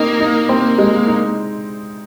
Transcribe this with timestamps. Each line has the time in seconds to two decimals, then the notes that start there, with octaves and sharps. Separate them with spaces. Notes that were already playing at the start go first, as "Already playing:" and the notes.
Already playing: A#3 C4 D#4
0.20 D#4
0.49 C4
0.78 G#3
1.07 D#4